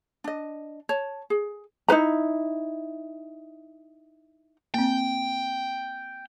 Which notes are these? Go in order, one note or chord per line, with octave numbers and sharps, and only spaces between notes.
D4 D#5
C#5 A5
G#4
D#4 E4 B4 A#5
A#3 C4 G5